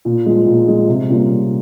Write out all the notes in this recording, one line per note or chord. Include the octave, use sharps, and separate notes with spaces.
A#2
F3 G#3
A#2
F3 G#3
C3
G3 A#3 C#4 F4
C3